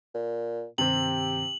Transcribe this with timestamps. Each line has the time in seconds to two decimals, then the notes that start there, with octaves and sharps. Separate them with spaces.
0.15 A#2
0.78 G2 C3 D#3 C4 G4 F#7